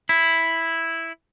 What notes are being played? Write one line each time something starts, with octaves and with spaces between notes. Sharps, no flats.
E4